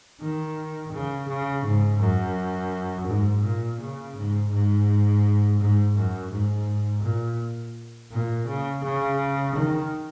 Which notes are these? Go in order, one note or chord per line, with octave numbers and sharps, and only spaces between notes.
D#3
C#3
C#3
G#2
F#2
G#2
A#2
C#3
G#2
G#2
G#2
F#2
G#2
A#2
A#2
C#3
C#3
D#3